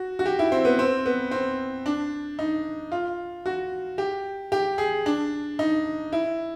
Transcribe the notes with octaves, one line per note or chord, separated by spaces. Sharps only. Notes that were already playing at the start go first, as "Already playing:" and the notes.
Already playing: F#4
F#4
G4
E4
C4
B3
C4
B3
C4
D4
D#4
F4
F#4
G4
G4
G#4
D4
D#4
E4